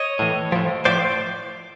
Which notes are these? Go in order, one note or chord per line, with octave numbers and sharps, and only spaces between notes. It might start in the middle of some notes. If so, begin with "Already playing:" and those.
Already playing: C#5 D#5
A2 E3
A2 F3
A2 F3 C5 D5